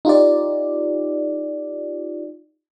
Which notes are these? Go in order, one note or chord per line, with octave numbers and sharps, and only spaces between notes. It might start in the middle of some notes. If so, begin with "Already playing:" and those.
D#4 F4 G4 D5